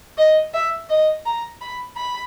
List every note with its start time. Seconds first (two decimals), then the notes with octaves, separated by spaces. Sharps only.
0.18 D#5
0.54 E5
0.89 D#5
1.25 A#5
1.61 B5
1.96 B5